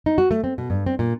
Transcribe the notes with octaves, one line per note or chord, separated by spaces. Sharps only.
D#4
F#4
A3
C4
B2
G2
C4
A#2